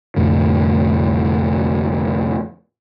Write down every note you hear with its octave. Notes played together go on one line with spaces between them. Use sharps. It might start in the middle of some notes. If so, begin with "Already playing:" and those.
C2 F2 A2 D3